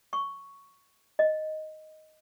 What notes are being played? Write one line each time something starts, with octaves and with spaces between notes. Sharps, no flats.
C#6
D#5